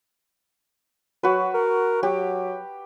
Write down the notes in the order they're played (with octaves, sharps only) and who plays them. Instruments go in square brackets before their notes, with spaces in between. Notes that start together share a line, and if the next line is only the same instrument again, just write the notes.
[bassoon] F#3 [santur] F#4 B4
[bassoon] A#4
[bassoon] F#3 [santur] G4